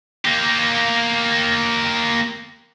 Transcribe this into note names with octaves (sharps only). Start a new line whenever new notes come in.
A#3 G4